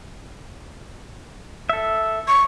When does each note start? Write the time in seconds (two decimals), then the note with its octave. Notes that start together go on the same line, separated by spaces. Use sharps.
1.69 A4 E5
2.28 C#6